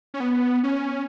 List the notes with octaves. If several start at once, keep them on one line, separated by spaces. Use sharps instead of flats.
C#4
B3
C#4